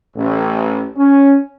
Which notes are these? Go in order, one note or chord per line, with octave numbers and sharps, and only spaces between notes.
A1
C#4